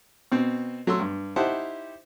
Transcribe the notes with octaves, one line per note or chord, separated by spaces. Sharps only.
B2 C4
F#3 A3 C6 E6
G2
D#4 E4 G4 C5 F#5 A5